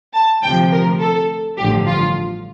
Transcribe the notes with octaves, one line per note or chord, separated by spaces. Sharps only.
A5
D2 C3 F3 G5
A#4
A4
A1 G2 D3 F3 G4
F4